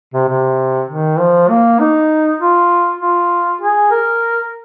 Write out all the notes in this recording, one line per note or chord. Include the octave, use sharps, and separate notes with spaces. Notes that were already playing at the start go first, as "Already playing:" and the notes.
C3
C3
D#3
F3
A#3
D#4
F4
F4
G#4
A#4